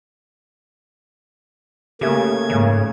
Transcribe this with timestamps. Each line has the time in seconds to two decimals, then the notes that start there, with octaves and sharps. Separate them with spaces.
2.01 C#3 A3 A#3 G4 G#4 E5 G#6
2.50 D#2 G#2 C#3